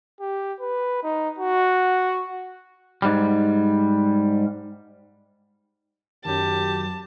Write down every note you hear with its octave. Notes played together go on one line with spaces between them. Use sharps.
G4
B4
D#4
F#4
G#2 G3
F#2 D#3 F#3 G4 A5